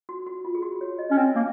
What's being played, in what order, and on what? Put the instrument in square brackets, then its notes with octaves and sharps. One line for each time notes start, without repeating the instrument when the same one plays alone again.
[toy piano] F#4
F#4
F4
G#4
F#4
C#5
D#5
[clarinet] C#4 [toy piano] D#5
[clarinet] C4 [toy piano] C#5
[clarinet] A#3